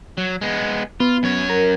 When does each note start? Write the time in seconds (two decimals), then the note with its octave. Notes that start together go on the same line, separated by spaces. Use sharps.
0.18 F#3
0.41 G#3 B3
1.00 B3 F4
1.23 F#2 C#5
1.50 A#4